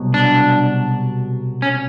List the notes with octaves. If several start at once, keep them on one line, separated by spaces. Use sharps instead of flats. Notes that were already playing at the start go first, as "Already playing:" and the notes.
Already playing: C2 B2 F#3
D4
C#4